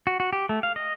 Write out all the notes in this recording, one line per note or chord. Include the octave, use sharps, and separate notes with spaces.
F#4
F#4
G4
A3
F5
D#5